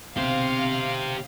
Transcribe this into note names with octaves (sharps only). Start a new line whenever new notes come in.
B1 D3 C4 G4 C5 F5